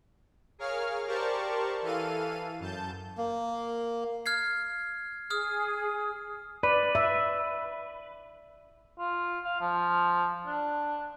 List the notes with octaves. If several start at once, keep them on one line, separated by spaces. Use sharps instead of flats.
G#4 A#4 C#5 F5 F6
G4 A#4 C5 D5 A5 C#6
E3 A4 F5 D#7
F#2 A5 G6
A#3
F6 G#6 C7
G#4 D#6 F6
B4 D5
E5
F4
F5
F3
D4